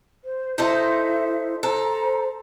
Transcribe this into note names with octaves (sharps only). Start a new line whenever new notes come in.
C5
D#4 E4 A4 C5 E5
A4 C5 A#5